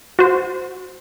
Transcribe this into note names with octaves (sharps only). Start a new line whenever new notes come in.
F#4 C5